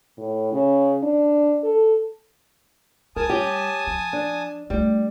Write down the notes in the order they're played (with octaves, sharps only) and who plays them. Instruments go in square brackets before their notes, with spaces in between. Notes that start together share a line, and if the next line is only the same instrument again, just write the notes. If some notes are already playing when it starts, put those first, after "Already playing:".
[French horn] A2
C#3
D4
A4
[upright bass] G3 [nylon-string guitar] A#4 [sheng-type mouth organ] G#5 A5 D#6
[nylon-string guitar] C#4 G4
[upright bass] F3
[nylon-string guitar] D4
[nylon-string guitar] G3 [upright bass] A3 F4